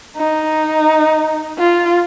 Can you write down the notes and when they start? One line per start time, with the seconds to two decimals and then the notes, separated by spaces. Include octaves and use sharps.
0.17 D#4
1.58 F4